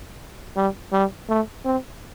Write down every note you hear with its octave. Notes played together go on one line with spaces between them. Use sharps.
G3
G3
A3
C4